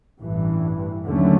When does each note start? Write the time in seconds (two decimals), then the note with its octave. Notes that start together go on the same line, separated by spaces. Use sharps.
0.21 A1 G2 E3
1.05 D#2 D3 F#3 A3 C#4